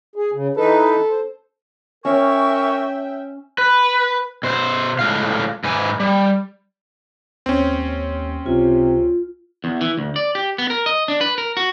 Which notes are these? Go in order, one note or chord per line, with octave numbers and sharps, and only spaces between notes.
G#4
C#3
E3 D#4 A4 B4
C5
C#4 A#4 E5 G5 G#5 C#6
B4
B2 C5
A2 G#3 F4 F5
G#2 B4 G#5
G3
D#2 C4 C#4
C#2 C3 F4
E2
E3
D2
D5
G4
B3
A#4
D#5
D4
B4
A#4
F#4